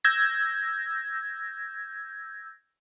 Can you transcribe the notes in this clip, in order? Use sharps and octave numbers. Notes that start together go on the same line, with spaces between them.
E6 G6 G#6 A#6